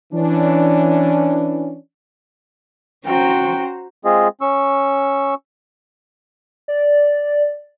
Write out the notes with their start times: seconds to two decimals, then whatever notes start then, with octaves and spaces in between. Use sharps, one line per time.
0.13 E3 C#4 D4
3.06 C#4 F#4 C5 G5 A#5
4.05 G#3 C4 F4 G#4 D#5
4.41 C#4 C#6 E6
6.68 D5